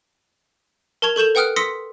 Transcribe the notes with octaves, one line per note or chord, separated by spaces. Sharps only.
A#4 A5 C#6 G#6 F7
A4 C#6 G6 E7 F7
B4 F#5 G5 D#6 F6 F#6
C6 D#6 E6 A#6 B6 C#7